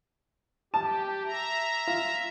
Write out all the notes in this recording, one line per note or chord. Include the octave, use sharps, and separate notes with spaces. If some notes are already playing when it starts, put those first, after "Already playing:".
G4 A5
E5 A#5
F4